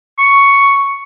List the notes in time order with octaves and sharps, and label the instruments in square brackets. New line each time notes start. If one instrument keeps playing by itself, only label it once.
[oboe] C#6